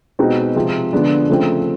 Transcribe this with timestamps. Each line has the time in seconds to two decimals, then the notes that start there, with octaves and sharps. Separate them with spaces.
0.19 B2 G#3 C4 D#4 F#4
0.56 C3 F3 G#3
0.93 D3 F3 G#3 B3 D4
1.29 C#3 F3 A3 C4